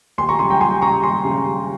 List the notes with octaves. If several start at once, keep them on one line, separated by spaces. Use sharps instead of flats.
D#2 G#5 C6
A#5 C#6
C#3 G3 G#5 C6
G5 A#5
D#2 G#5 C6
C#3 G3 A#5 C#6
D#2 G#5 C6
C#3 G3
D#2